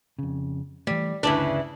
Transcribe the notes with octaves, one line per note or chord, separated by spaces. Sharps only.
F2 C#3
E3 G3 A3
G1 D2 C#3 E3 D4